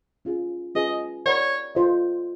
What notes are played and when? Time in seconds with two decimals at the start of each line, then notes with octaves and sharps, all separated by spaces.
0.25 C#4 F4 G#4
0.75 C#4 F4 G#4 B4 D#5
1.26 A#4 C#5 D5 F#5 B5
1.75 F4 A4 C5 D#5